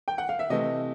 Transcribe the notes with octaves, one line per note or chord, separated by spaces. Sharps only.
G5
F#5
F5
E5
C3 E3 A3 D#5